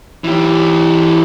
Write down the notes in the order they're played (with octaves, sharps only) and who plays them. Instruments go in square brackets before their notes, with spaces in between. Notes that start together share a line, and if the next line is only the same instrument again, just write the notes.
[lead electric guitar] E3 G4